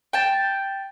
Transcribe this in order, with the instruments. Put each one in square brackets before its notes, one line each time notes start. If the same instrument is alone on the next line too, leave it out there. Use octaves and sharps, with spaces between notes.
[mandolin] G5 A5